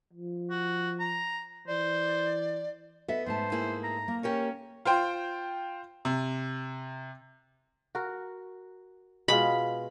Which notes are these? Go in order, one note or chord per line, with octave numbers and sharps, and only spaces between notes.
F3
F#4
A#5
E3 C5 D5
B3 A4 D#5 E5
G#2 A3 C5 A5
A#3 E4 G#4
A#5
A#3
C#4 G4 A#4 C#5
F4 C5 G5
C3
F#4 A#4
B2 G#3 F4 B5